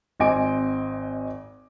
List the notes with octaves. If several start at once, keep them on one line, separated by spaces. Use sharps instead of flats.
G#1 C4 D#5 G#5 D6 D7